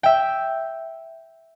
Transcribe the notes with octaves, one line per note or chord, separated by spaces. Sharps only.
E5 G5